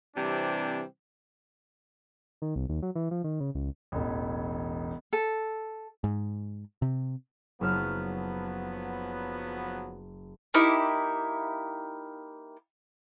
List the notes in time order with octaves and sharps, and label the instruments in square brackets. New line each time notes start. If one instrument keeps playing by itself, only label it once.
[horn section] C3 E3 G3 C4 D4
[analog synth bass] D#3
C2
D#2
F#3
E3
F3
D#3
C#3
C#2
[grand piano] E1 A1
[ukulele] A4
[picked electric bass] G#2
C3
[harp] F#1 E6 F6 [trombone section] F3 F#3 B3
[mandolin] A#3 D#4 E4 G4